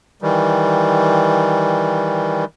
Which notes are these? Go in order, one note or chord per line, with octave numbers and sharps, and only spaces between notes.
D#3 E3 G3